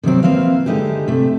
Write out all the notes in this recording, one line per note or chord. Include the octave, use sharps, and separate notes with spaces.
C3 D#3 F#3 C4
A#3 C4 E4 B4 F5
D3 G#3 D#4 E4 G4
C3 A3